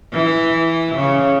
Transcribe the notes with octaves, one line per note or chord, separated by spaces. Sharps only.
E3
C#3